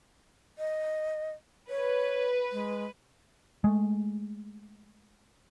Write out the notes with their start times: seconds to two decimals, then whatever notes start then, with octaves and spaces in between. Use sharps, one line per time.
0.59 D#5
1.70 B4 C#5
2.52 G#3
3.64 G#3 A3